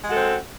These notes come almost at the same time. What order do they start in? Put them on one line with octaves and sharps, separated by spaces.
G#3 F#4 A4 C4